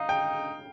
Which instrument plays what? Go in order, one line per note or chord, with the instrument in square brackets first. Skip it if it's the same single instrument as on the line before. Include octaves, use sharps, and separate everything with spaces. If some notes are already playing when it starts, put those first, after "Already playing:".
Already playing: [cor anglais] D#4 [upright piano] F5
[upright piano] G5